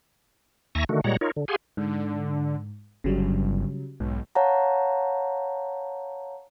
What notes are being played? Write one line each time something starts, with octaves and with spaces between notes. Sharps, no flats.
D#2 E5 G#5 A#5 C#6 A#6
D3 D#3 A3 F#4
A#2 G3 G#3 C#5 F#5 A#5
D#4 F4 A#4 C#5
D3
G4 G#4 F5 F#5 G#5 C6
G#2 D3
G1 C#3 F#3 G3
B1 G#2
C#5 F5 F#5 A5 A#5